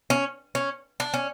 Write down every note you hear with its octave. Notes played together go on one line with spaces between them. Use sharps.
C#4
C#4
D4
C#4